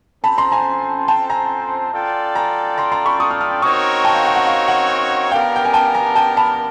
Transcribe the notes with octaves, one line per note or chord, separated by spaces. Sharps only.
C4 F4 A4 C5 A5 B5
A#5 C6
G#5 A#5
G5 A5
G#5 A#5
F4 A4 D5 G5
G#5 A#5
A#5 C6
A#5 C6
B5 C#6
C#6 D#6
D#6 F6
D#6 F6
C4 D#4 F#4 A#4 C#5 C#6 D#6
G5 A5
F5 G5
F#5
F#5
F5
F#5
B3 D4 G4 A#4 F5 G5
G5
G#5
G5 A5
G#5 A#5
G5 A5
A5 B5